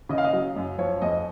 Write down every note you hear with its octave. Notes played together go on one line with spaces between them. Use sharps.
C#3 D#5
F5
D#5
F#3
F#2
F3 C#5
F2 D#5